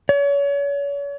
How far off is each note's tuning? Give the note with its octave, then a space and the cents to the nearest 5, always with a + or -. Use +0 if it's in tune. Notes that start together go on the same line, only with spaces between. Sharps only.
C#5 +35